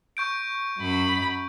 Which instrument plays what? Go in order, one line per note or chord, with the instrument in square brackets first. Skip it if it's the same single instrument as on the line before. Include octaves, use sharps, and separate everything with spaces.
[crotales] C#6 G6 D7
[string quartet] F#2 B5